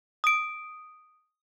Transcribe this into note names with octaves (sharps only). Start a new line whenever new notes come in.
D#6 D7